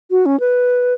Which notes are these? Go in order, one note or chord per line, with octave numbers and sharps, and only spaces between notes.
F#4
C#4
B4